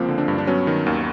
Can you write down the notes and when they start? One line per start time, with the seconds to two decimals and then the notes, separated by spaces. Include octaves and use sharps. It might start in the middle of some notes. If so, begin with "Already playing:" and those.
Already playing: C#2 F3 A#3 C4
0.08 D3
0.18 C4 D4
0.28 G2
0.38 D4
0.47 F#3 B3 C#4
0.67 D#3
0.86 D#2